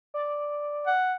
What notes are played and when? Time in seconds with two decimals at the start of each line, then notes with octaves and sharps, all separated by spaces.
0.14 D5
0.87 F#5